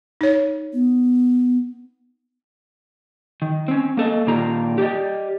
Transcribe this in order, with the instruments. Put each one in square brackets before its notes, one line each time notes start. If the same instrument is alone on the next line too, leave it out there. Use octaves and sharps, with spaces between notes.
[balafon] D#4 C#5
[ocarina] B3
[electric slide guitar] D#3
C4 C#4
A#3 A4 D#5
A#2 D#3 D4 F4 G4 A#5
G4 G#4 C5 D5 D#5